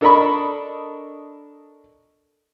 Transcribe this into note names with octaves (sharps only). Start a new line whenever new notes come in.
D4 A4 A#4 D#5 B5 C#6